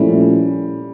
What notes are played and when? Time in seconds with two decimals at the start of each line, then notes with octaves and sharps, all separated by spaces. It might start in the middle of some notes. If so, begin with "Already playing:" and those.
Already playing: A#2 F3 G3 A3 C#4 E4